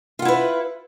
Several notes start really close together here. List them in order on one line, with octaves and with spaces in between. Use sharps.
F4 F#5 E4 B4